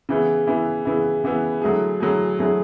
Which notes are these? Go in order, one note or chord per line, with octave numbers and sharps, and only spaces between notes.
C#3 E3 B3 E4
C#3 E3 B3 E4
C#3 E3 B3 E4
C#3 E3 B3 E4
D3 F#3 A3 E4 G#4
D3 F#3 A3 E4 G#4
D3 F#3 A3 E4 G#4